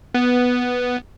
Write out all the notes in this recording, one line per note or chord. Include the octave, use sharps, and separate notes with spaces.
B3